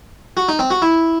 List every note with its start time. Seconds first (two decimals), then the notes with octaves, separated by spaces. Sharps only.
0.37 F#4
0.49 D#4
0.59 C4
0.71 F#4
0.82 E4